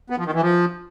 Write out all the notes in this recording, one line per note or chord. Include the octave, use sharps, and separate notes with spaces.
B3
F3
D#3
E3
F3